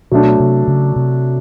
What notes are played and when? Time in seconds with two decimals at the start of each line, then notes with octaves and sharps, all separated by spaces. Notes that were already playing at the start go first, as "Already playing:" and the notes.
0.11 B2 F#3 A3 D4
0.40 C3
0.68 C#3
0.96 C3